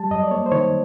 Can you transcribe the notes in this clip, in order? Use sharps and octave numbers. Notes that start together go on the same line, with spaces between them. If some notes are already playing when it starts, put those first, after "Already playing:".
Already playing: G3 A5
F#2 D#5
D5
A#3 C#5
C5
D#3 C#5